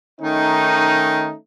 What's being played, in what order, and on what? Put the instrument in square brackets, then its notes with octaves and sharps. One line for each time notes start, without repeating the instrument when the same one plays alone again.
[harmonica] D#3 [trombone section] A3 C#4 D#4